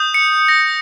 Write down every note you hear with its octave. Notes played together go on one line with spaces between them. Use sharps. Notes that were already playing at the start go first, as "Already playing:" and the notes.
Already playing: D#6 G6
C#7
A#6